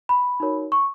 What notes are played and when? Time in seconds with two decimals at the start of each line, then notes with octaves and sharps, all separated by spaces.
0.09 B5
0.40 D#4 F#4 A#4 C#5
0.72 C#6